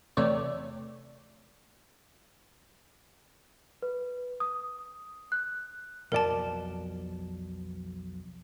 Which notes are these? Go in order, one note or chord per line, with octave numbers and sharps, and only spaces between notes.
E2 C3 A3 C#5 D5
B4
D#6
F#6
B1 F2 A#4 D5 A5